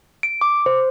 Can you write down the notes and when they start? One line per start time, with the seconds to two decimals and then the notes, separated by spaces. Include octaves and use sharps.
0.23 D7
0.41 D6
0.66 C5